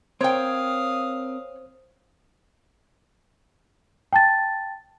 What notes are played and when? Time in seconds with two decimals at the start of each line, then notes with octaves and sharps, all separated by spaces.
0.21 C4 A#4 C5 C#5 F5 G5 D#6
4.13 G5 A5 A6